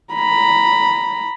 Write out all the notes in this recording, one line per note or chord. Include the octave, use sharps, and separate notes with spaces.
A#5 B5